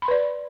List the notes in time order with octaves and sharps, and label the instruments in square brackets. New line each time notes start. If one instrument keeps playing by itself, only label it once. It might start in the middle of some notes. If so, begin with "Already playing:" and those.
[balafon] B5
C6
B4
D5